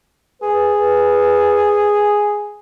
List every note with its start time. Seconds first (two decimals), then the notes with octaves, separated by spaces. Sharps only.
0.42 G#4 B4